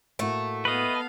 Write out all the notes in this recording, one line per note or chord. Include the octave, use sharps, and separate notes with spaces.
A2 A3 A#3 F#4
B3 B4 D#5 F5